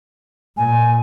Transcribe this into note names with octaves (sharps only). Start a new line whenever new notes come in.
A#2 G#5